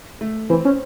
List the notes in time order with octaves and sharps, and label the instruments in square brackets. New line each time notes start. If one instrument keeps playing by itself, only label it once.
[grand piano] A3
[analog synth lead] E3 [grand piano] C4
[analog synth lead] C#4